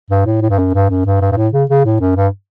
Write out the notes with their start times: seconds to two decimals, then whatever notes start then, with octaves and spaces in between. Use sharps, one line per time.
0.11 G2
0.26 A2
0.42 A2
0.50 G2
0.59 F#2
0.74 G2
0.90 F#2
1.06 G2
1.21 G2
1.32 G2
1.37 A2
1.53 C#3
1.70 C#3
1.85 A2
2.01 F#2
2.17 G2